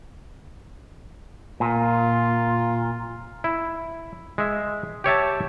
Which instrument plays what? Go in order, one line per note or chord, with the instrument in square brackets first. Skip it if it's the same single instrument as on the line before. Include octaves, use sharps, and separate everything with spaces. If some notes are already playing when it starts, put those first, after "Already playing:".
[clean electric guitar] A#2 [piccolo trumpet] F4
[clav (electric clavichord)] E4
G#3 E5
G4 C#5 E5 A5